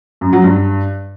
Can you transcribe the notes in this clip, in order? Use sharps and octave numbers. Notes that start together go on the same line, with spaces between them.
F#2
F#3
G2